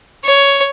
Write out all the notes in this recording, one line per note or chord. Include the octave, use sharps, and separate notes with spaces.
C#5